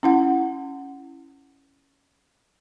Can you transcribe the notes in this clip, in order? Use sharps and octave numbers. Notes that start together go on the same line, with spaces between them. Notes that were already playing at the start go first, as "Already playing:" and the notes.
C#4 E4 F#5